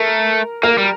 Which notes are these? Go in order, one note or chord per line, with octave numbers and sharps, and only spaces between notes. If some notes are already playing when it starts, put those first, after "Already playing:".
Already playing: A3 A#4
A#3 A#4
G3